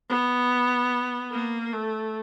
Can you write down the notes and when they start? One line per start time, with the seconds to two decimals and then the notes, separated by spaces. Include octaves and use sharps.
0.10 B3
1.32 A#3
1.73 A3